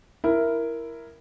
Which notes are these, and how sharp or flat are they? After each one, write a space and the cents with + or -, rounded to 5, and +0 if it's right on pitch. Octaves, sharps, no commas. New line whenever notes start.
E4 +10 A#4 +0